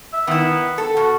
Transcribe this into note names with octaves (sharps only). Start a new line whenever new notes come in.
E5
D#3 B3 E4
A4
B2 F#4